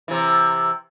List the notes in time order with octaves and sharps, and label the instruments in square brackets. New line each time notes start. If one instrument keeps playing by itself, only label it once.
[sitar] C3 E3